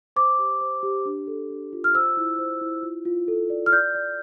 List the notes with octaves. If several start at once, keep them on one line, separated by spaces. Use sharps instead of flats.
C5 D6
G4
C5
G4
D4
A4
D4
F4
F6
C5 E6
E4
C5
E4
F4
F4
A4
D5
F6
D5 G6
D5